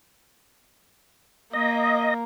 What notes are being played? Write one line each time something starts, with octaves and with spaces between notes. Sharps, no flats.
A#3 D#5